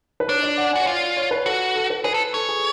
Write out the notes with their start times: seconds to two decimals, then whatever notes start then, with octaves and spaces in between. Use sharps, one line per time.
0.20 B4
0.29 D4 C#5
0.43 D5
0.58 F#5
0.73 G#5
0.76 F#4
0.81 C#5
0.87 F4 D5
1.17 C#5
1.31 B4
1.46 F#4 A4
1.75 A4
1.90 B4
2.04 G#4 B4
2.14 A4
2.34 A4 C#5
2.49 G#4